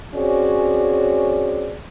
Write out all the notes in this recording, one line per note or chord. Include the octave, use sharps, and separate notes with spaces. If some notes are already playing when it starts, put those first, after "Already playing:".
C4 C#4 F#4 G#4 C#5 D5